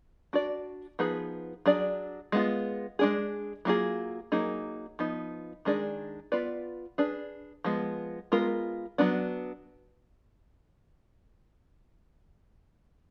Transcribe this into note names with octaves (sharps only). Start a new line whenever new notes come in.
D4 F#4 D5
F3 B3 D#4 G#4 B4
F#3 D4 G#4 D5
G#3 B3 F4
G#3 D4 G#4
F#3 A#3 F4 G#4
F#3 A#3 D#4 G#4
F3 B3 D#4
D#3 G#3 D4 G#4 D5
B3 F4 B4 D5
D4 G#4 B4
F3 G#3 B3
G#3 B3 F4 A#4
F#3 B3 D4